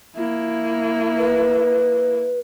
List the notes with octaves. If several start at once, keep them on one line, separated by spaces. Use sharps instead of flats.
A#3 E4
B4